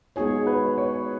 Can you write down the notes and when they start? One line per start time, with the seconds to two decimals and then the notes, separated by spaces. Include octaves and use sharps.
0.16 G#3 B3 D#4 F#4 G#4 C#5
0.47 B4
0.78 C#5